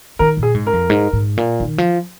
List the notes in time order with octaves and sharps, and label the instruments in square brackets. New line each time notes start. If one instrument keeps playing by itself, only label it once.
[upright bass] D#3 [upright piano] A#4
[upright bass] A#2
[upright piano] G#4
[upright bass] G#2
[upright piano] A#4
[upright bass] F2
G#2
G#2
A#2
D#3
F3